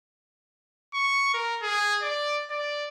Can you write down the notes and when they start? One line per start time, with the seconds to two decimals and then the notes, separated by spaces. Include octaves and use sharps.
0.94 C#6
1.34 A#4
1.62 G#4
2.02 D5
2.50 D5